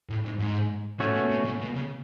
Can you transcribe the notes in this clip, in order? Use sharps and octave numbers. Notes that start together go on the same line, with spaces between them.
A2
G#2
G#2
A2 A3 C#4 F#4 C#5
B2
B2
A2
B2
C#3